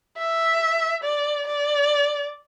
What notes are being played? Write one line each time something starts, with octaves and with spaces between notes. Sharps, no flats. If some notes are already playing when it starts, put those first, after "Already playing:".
E5
D5
D5